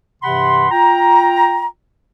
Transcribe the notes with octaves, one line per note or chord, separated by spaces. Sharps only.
G2 C3 E3 F#5 B5 C6
F4 G5 A#5